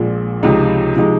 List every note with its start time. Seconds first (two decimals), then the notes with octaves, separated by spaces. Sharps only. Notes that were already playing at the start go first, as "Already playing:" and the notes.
Already playing: A#1 A#2 G#3
0.43 C#2 C3 F3 G#3 D#4
0.96 C3 F3 G#3 D#4